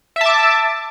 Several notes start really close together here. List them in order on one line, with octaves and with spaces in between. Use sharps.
E5 A5 D6